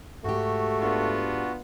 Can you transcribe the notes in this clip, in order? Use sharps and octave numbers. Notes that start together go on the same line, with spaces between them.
G#2 A3 F#4 G4
B3 D4 F4